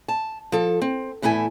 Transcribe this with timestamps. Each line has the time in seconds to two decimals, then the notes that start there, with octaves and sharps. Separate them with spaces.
0.08 A5
0.52 F3 A4
0.82 C4
1.22 E2 A2 E4 A4 G#5